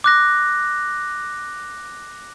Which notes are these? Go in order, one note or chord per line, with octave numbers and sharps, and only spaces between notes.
D6 F#6 A#6